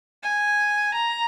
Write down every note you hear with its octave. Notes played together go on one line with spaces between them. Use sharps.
G#5
A#5